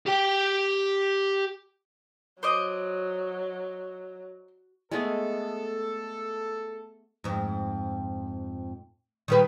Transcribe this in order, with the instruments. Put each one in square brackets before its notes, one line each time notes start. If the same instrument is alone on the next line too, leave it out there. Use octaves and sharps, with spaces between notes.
[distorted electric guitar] G4 G5
[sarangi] F#3 [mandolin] C5 D5 D#5
[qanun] G#3 A3 B3 [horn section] A4
[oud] F2 G#2
D#3 G3 B4